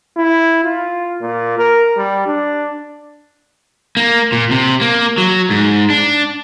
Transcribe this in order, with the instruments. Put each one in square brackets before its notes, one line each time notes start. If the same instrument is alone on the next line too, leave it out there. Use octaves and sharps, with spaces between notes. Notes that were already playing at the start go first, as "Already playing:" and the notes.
[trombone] E4
F4
A#2
A#4
G3
D4
[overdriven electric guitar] A#3
A#2
C3
A#3
F#3
G#2
D4